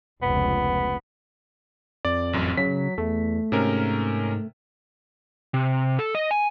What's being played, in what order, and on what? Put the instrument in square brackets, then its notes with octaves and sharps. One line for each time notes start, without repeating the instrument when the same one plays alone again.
[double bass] F1 C#2 [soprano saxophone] B3
[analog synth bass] F2 [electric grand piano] D5
[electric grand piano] A1 F#2
[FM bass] C#3 [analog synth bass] F#3 [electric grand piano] B6
[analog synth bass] E2 [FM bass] A3
[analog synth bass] G#2 [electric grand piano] C3 C#4 A#4
[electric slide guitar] C3
A4
D#5
G#5